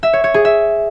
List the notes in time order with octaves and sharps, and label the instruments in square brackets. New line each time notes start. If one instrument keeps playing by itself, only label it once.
[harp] E5
C#5
C#5
G#4
E5